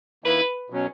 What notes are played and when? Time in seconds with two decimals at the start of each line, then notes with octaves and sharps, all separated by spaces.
0.24 D#3 A#3 E4 B4
0.70 B2 F#3 C#4